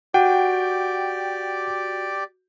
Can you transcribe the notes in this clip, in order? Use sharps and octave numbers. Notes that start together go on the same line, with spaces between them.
F#4 G4 D5 F#5 G5